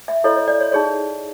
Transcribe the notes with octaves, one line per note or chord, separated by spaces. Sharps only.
E5
E4 A4 C#5 D#5
C#5
D5
C#5
D#4 G#4 C#5 D5